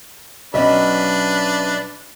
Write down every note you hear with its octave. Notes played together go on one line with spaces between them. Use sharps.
B1 F#3 C#4 D4 B4 D#5 E5